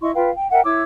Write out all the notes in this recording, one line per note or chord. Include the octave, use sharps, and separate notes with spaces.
E4 D#5 C6 C#6
F4 B4 F5 G5
G5
A#4 E5 F#5 G5
E4 C#5 D6 E6